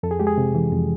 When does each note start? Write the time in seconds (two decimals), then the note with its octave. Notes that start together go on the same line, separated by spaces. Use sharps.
0.03 F2 A4
0.11 G#4
0.20 G#3 G4
0.27 G#4
0.38 C3
0.55 E3
0.72 F2